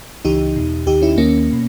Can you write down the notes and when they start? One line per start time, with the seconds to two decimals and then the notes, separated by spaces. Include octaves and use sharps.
0.25 C#2 C#3 E3 D#4 G4
0.56 E2 B2
0.87 D#2 D#3 D#4 G4
1.02 C#4 E4
1.17 D#2 D#3 A#3 C#4
1.53 B2